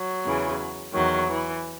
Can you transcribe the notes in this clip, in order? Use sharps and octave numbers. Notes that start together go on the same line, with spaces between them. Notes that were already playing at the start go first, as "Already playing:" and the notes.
Already playing: F#3
E2 C#3 E3
E2 D#3 F#3
E3